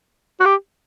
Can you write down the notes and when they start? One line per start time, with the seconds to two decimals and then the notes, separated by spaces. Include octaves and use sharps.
0.40 F#4
0.45 G4